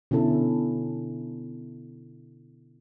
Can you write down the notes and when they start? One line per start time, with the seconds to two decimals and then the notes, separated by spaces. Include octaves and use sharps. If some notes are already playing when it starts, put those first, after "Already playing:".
0.11 B2 D3 C#4 E4 A4